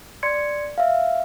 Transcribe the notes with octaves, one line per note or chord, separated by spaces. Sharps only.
D5 C6 G#6 C#7
E5 F5